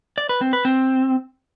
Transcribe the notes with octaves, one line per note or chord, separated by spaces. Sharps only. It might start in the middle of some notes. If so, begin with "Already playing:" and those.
D5
B4
C4
B4
C4